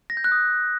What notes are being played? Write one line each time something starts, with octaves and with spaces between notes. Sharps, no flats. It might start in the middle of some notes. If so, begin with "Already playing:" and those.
A#6
G6
F#6
D#6